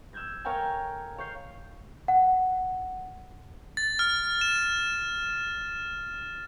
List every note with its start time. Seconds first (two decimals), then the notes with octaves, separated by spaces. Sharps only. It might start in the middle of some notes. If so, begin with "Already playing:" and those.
0.13 E6 F6 G6 G#6 A#6
0.45 A4 A#4 C#5 F5 G5 G#5
1.18 C#5 F5 G6 C7
2.08 F#5
3.77 A6
3.99 F6
4.41 E7